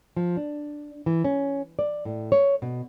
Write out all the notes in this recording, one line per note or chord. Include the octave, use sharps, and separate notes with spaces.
F3
D4
E3
C#4
D5
A2
C#5
B2